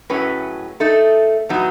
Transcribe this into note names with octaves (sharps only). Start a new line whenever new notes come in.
A2 F#3 C#4 G#4 B4
A3 D#4 A4
A2 F#3 B3 D#4 F#4